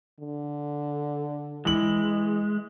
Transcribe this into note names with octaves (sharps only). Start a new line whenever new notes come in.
D3
E3 G#3 F#7